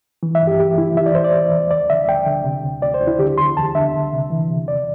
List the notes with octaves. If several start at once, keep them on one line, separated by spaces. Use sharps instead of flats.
E3
E5
G2
G4
E3 G4
E3 E4
E3 E5
D5
E2 C5
D5
E3
E2
D2 D5
D3 E5
D2 G5
D3
C3
D2
D2 D5
C5
D2
E4
D3 G4
E2 C6
E2 A5
D3 E5
C2
C3
E3
C3
E2 D5